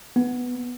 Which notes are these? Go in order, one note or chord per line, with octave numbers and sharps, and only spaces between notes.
B3